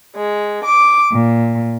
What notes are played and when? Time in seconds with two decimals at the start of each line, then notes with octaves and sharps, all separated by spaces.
0.17 G#3
0.65 D6
1.13 A#2